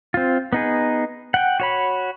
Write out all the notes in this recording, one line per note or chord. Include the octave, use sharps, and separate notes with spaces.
C4 F4
B3 D#4 G#4
F#5 G5
F#4 C#5 B5